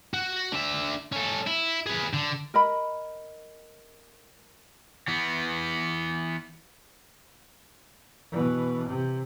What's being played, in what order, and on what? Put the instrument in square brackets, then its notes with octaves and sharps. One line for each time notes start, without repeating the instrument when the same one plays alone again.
[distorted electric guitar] F#4
D3 E5
C#4 A4
E4
G#4 B4
D3
[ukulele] A#4 D#5 B5
[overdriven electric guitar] E3 B3
[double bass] B2 E3
C3